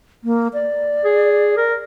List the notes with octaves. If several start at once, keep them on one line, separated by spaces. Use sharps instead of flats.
A#3
D5
G#4
A#4